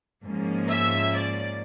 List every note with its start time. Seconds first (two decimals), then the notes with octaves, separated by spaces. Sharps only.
0.23 G#2 F3 A#3 C#4
0.69 E5
1.15 D5